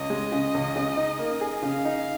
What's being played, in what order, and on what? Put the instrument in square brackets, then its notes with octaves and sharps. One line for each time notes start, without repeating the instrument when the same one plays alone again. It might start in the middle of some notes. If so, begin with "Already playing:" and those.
Already playing: [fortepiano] C#2 [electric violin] D#5
[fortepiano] G#3
C#3
C#2
C#3
D#4
A#3
G#4
[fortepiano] C#3 [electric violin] F5
[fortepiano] D#4